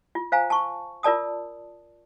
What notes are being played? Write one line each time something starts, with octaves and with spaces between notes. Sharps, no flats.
F4
C5 F5 G#5 A#5
A5 C#6
F4 A#4 D5 A5 D#6